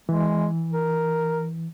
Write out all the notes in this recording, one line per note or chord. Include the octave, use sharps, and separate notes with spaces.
E3 G#3
A#4